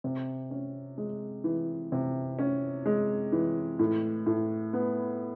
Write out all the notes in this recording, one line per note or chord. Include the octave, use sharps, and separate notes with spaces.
C3
C#4
G#3
E3
C3
C#4
G#3
E3
A2
A2
B3